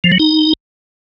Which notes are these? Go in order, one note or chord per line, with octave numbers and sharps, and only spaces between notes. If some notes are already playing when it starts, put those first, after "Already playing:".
F3
F#3
D#4